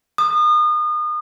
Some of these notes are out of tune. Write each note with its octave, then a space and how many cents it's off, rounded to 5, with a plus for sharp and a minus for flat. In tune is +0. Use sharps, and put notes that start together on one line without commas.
D#6 -35